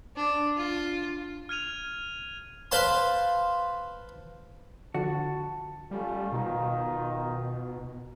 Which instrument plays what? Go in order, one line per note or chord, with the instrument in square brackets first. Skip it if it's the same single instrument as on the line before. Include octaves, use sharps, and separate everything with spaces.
[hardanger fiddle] D4
F4
[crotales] F6 G#6 D#7 F7
[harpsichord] B4 C5 F5 A5 C6
[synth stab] D3 F3 [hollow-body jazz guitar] F#4 [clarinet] A5
[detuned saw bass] G3 [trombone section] A3 C#4 F4
[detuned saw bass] B2 [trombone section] D#3 D#4 F4